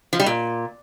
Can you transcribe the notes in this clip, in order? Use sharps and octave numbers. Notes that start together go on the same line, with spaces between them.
F3
G3
A#2